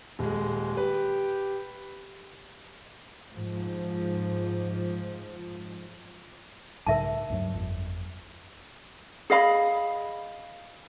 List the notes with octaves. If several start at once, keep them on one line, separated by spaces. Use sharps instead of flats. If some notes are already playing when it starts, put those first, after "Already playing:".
D#1 G#3
G4 B4
G#2 F3
B1 G#2 C#3 A#4 E5 A5
D2 G2 F#3
G1 F2
G#4 D#5 F5 B5